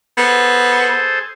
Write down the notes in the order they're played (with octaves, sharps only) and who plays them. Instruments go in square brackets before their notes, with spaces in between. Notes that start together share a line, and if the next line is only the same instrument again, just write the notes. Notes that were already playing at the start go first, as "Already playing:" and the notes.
[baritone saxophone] B3 [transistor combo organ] G#4 A4 C5